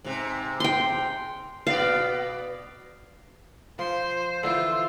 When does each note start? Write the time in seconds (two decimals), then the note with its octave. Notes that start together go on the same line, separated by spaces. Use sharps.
0.04 G#2 C3
0.60 G5 C6
1.67 B2 B3 D5 F5
3.79 F3 C5 C6
4.43 D3 E3 F4 E5